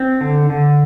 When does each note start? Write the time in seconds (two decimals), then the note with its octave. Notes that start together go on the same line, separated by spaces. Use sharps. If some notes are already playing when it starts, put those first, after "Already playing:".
Already playing: C4
0.21 D3
0.50 D3